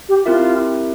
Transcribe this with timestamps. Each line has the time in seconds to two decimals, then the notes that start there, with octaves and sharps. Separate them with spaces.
0.09 G4
0.25 C4 E4 F4 G4 A#4 E5